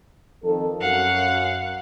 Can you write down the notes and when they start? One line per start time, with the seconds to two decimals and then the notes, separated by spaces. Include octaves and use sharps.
0.44 F2 D#3 A4
0.80 F#2 F5 F#5